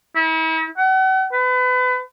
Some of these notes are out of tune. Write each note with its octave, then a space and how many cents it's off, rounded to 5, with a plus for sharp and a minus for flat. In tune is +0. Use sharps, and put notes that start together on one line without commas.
E4 -40
F#5 +40
B4 +30